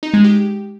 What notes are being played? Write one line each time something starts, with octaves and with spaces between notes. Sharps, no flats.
D#4
G#3
G4